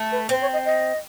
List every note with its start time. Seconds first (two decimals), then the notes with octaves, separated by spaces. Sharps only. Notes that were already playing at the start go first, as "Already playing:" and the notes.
Already playing: A3
0.12 B4
0.29 C4 C5
0.41 C#5
0.53 D#5
0.65 D#5